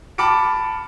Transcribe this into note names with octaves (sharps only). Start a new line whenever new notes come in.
A5 B5 D6 F6 C#7 D7